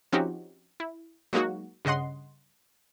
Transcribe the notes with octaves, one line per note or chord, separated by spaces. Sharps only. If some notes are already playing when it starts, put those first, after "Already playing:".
F3 C4 C#4 D#4 F#4 G4
E4
F#3 G#3 A#3 D#4 F#4
G2 C#3 D#5 F#5 C6